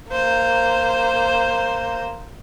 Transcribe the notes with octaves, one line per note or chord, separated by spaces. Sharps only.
A#3 C5